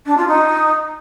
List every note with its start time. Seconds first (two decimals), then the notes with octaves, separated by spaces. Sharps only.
0.06 D4
0.17 F4
0.28 D#4